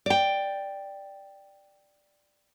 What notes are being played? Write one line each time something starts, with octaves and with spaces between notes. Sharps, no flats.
D5 G5